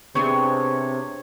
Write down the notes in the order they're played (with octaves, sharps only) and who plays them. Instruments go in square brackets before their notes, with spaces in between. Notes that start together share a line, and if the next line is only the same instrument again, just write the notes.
[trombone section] C3 [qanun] B3 D4 G#4 [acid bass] C4 [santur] C#5